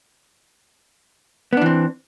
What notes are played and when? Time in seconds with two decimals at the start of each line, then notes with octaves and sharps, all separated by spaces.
1.53 B3
1.57 D4
1.61 E3
1.66 C4